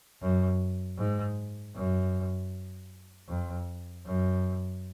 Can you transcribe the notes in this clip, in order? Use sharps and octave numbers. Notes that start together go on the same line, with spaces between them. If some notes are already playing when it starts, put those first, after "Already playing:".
F#2
G#2
F#2
F2
F#2